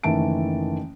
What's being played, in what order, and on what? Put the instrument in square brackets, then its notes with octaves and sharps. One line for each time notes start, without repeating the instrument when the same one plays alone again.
[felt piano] F#1 D#3 E3 A3 A5 D7